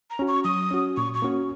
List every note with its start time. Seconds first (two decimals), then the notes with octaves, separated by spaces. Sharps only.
0.10 A#5
0.19 C#4 F#4
0.28 C#6
0.44 F#3 D#6
0.71 C#4 F#4
0.97 A#2 C#6
1.14 C#6
1.22 A#3 C#4 F#4